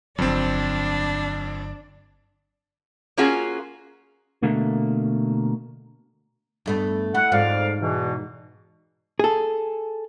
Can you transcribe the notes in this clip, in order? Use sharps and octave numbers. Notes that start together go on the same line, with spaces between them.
G1 F2 D3 F#3 C4 D4
A#3 C#4 F4 F#4 G#4
B2 D3 A3 A#3
G2 A3 B3
A3 E4 F#5
F2 G#2 D5 F5
E2 B2 E3
G#4 A4